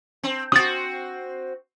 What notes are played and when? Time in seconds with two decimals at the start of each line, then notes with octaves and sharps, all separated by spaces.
0.23 C4
0.52 C4 F#4 D#6 A6